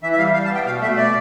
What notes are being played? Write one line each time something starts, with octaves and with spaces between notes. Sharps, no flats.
E3 E5
E5
G3 F5
G3 F5
A5
B3 G5
B2 F5
A3 E5
B2 D5